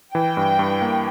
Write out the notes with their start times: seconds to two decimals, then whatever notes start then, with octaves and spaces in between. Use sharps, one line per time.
0.15 E3 G5
0.37 G2
0.59 G2
0.82 A#3